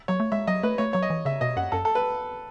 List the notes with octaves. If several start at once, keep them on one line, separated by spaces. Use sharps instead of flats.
F#3 C#5
A3
G#3 E5
F#3 D#5
A3 B4
A3 C#5
F#3 C#5
D#5
E3
C#3 E5
B2 D#5
F#2 F#5
F#2 A4
A4
B4